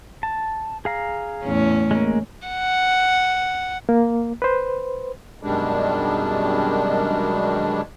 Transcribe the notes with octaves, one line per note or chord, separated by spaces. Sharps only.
A5
G#4 F5 A#5
E2 A2 C#4
G#3 A#3
F#5
A#3
B4 C5
F#2 B2 D#3 G3 G#3 D4